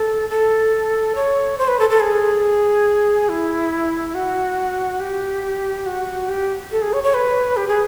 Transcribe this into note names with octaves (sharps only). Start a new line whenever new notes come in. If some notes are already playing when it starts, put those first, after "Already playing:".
Already playing: A4
A4
C#5
C5
B4
A4
A4
G#4
E4
F#4
G4
F#4
G4
A4
G#4
C#5
C#5
B4
G4
G#4